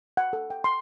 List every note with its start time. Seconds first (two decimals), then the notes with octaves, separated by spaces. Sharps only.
0.17 F#5
0.33 A4
0.50 G5
0.64 C6